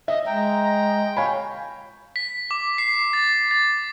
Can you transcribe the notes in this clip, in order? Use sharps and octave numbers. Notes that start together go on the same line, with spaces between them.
D#5 E5
G#3 G5 A#5
C#5 F5 G#5 B5
B6
D6
C7
A6
A6